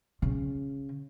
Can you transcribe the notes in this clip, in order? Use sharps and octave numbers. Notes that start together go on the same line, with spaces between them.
C#3